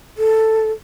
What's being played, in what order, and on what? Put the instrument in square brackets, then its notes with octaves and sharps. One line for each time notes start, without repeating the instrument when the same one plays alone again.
[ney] A4